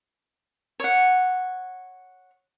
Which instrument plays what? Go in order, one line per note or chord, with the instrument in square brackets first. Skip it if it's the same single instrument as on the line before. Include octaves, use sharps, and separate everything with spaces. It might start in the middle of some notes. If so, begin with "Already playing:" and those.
[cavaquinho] C#5 F#5